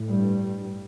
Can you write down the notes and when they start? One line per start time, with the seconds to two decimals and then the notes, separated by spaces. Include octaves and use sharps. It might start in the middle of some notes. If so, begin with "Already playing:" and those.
Already playing: A2
0.08 G2 G3